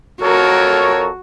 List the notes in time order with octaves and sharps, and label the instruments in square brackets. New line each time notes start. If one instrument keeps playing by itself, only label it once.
[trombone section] F2 A4 A#4 [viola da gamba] F#4 [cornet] C#5